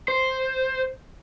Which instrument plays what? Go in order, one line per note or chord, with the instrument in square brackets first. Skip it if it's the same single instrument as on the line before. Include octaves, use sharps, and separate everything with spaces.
[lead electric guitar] C5